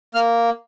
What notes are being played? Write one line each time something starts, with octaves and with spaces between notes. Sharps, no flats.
A#3 F6